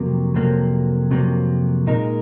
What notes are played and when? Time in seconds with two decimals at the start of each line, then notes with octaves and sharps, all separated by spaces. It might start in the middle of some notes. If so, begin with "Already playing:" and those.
Already playing: F2 C3 F#3 A#3
0.34 F2 C3 F#3 A#3
1.11 F2 C3 F#3 A#3
1.87 A#2 G#3 D#4 A#4